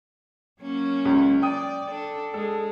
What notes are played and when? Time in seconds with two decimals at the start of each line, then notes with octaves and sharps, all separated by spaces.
0.61 F#3 A#3 C#4
1.05 C#2
1.42 D5 G5 D#6
1.89 D4 A4
2.34 G#3 A4